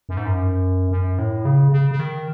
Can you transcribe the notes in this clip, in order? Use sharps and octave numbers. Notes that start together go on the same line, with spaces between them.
F#2
G#2
F#2
F#2
A2
C#3
C#3
C#3
D#3